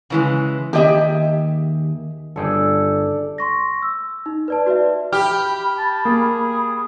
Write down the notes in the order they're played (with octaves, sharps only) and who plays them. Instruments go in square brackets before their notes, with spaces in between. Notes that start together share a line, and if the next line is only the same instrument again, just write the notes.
[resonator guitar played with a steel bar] C#3 E3 G#3
[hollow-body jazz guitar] D#2 D#5 [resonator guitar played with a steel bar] G4 G#4 E5
[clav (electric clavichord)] G1 G#4 G5 [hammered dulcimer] A4 D5
[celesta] C6 C#6 A#6
E6
D#4
B4 D5 A5
F#4 B4 D5 E5
[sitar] G4 [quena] B5 [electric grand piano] F6
[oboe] A5
[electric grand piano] A#3 [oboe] G#4